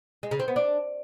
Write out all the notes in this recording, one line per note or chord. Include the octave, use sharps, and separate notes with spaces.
G#3
C#3
C4
B3
D4